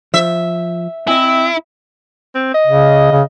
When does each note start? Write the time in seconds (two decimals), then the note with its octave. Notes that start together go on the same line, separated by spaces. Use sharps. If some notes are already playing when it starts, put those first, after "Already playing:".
0.14 F3 E5
1.07 C4 E4 D#5 G#5
2.35 C4
2.54 D#5
2.67 C#3
3.12 C#3